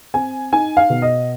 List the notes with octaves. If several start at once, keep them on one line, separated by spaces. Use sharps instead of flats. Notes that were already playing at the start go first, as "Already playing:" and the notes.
C4 G#5
D#4 G#5
F5
B2
D#5